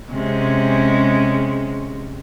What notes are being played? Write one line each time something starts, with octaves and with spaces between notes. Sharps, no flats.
C3 G#3 C#4